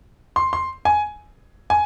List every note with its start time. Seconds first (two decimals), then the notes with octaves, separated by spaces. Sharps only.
0.36 C6
0.53 C6
0.85 G#5
1.70 G#5